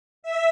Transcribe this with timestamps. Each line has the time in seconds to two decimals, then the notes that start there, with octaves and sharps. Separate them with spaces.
0.23 E5